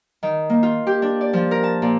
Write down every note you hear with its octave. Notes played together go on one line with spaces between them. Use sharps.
D#3
A#3
F4
G4
D4
D5
F3
A#4
A5
A#2